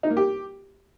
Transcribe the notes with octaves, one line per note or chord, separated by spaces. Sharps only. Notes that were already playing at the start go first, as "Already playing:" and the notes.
D#4
A#3
G4